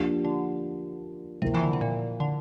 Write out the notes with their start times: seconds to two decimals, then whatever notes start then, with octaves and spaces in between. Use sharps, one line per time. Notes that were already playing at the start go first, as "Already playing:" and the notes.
Already playing: F3 A#3 D4 G4
0.25 D3
1.42 C3 F3 A#3 E4 A#4
1.55 E3
1.63 D3
1.73 C3
1.81 A#2
2.20 D3